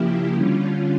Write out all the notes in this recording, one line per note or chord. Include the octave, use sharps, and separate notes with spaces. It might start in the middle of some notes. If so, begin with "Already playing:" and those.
Already playing: C#3 F3 A#3 E4 G4
D3 G3 C#4 F4